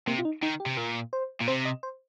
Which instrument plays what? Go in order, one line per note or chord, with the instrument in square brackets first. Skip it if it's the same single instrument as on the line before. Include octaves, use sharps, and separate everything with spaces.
[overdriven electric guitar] C3 [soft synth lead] A#3
[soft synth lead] F4
D#4
[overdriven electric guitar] D#3 [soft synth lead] D#4
[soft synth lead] G4
[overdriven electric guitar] C3
[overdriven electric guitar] A#2 [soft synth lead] A#4
[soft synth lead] C5
[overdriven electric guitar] A#2
[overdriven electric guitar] C3 [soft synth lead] C5
[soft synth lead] D#5
C5